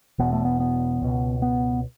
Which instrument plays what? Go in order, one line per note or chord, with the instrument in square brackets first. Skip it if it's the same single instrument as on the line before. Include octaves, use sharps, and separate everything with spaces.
[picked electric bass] E1 E2 B2 B3
A3
B3
B3
C#2 B2
B3